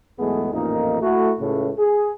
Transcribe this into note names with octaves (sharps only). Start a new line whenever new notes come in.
B1 E2 G#3 A3 B3 G#4
A1 F2 A#2 A#3 D#4
A3 E4 F#4
C#2 A2
G#4